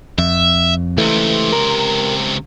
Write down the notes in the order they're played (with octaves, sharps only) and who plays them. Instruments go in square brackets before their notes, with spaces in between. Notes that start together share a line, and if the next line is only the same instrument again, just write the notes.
[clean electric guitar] F2 [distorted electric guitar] E5
[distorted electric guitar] C#2 C3 [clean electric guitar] E3 A3
[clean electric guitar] A#4